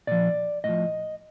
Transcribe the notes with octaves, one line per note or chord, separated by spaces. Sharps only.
A#2 F3 D5
A2 F3 D#5